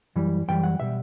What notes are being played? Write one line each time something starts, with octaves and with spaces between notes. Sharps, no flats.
F#2 E3 G3
F#2 E3 G3 G5
F#5
B2 G3 E5